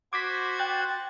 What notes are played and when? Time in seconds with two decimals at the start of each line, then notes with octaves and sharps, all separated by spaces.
0.13 F#4 C5 D6 G#6 B6
0.59 G5 F#6 A6